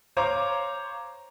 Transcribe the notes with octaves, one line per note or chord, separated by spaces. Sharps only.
C5 C#5 F5 A#5 D6